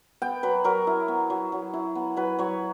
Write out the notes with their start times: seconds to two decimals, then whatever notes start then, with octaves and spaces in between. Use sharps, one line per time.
0.22 B3 G5
0.43 F#3 B4
0.64 F#3 A#4
0.87 E4
1.08 B3
1.30 F#3
1.52 F#3
1.73 E4
1.95 B3
2.17 F#3 B4
2.39 F#3 C#5